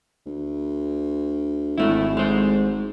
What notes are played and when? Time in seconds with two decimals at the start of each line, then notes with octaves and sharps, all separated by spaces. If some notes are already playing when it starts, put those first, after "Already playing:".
0.26 D2
1.78 G#1 G#2 A3 E4
2.17 G#3 C5